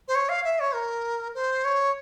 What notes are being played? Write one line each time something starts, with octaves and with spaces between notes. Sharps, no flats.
C5
C#5
F5
E5
C#5
A#4
C5
C#5